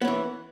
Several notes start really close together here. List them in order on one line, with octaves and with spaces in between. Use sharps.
B3 C#4 E3